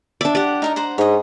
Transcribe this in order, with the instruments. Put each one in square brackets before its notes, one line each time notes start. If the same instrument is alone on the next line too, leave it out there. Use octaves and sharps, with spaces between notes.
[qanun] D4 D5 [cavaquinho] E5
[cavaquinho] G4 F#5 [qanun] D5
[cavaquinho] D#4 A#4 D#5
C5 F#5 A#5
[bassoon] G#2 [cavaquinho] C#5 D#5